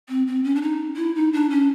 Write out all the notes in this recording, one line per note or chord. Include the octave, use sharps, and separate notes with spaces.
C4
C4
C#4
D4
D#4
E4
D#4
D4
C#4